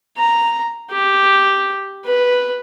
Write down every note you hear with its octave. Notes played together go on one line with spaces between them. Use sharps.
A#5
G4
B4